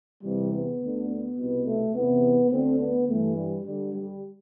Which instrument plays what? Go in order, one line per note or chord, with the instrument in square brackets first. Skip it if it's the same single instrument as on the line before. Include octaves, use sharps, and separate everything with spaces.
[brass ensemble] E2 C3 E3 G3
B3
D2 D3
B3
C2 B2
A3
E2 C3 E3 B3
D2 D3 C4
B3
G2 E3 A3
G3
G2 D3 G3
G3